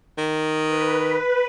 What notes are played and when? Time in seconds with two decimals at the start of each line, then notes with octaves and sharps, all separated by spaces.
0.18 D#3
0.63 B4